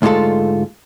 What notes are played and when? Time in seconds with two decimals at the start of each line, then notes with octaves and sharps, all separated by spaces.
0.02 D2 G#2 G#3 A3 F4 A4